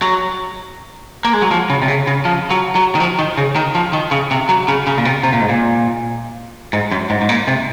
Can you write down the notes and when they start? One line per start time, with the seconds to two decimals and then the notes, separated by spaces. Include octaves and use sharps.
0.02 F#3
1.25 A#3
1.33 G#3
1.42 F#3
1.51 F3
1.70 C#3
1.82 C3
1.88 C#3
2.07 C#3
2.25 F3
2.51 F#3
2.75 F#3
2.95 D#3
3.00 F3
3.19 D#3
3.37 C#3
3.56 D#3
3.75 F3
3.93 D#3
4.11 C#3
4.31 C3
4.49 F#3
4.68 C#3
4.87 C#3
4.98 A#2
5.05 C3
5.23 C3
5.33 A#2
5.41 G#2
5.49 A#2
6.73 G#2
6.91 F#2
7.10 G#2
7.21 G#2
7.29 A#2
7.47 C3